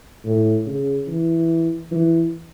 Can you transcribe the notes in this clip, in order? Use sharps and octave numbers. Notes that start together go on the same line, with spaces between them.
A2
C#3
E3
E3